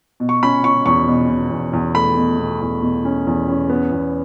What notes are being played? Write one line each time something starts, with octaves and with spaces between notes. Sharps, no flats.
B2
C#6
C#4 B5
C#4 C#6
E2 C#6
B2
B2
E2
E2
A3 B5
B2
B2
E2
B2
C#4
E2
C#4
B3
E2